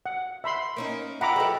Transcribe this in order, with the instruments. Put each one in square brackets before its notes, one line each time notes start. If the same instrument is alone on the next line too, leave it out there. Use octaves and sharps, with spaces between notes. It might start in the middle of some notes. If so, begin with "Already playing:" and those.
[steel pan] F#5
E5 B5 C6
[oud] A#3 C#4 D#4
[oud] F4 [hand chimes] E5 G5 E6 [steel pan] F#5 A#5 D6 [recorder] B5
[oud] F#3 A4 [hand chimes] G#4 B4 D#5